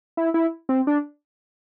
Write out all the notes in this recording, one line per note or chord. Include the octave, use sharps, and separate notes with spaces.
E4
E4
C4
D4